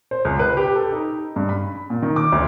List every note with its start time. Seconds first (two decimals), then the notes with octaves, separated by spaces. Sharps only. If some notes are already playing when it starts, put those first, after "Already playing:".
0.11 C5
0.25 C#2
0.39 B4
0.57 G4
0.75 A4
0.92 D#4
1.36 G2
1.49 B5
1.90 A#2
2.02 D#3
2.16 D6
2.32 D2